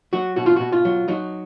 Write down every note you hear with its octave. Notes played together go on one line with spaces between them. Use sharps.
F#3 F#4
B2 F#4
F4
B2 F#4
F4
F#3
F#3 D#4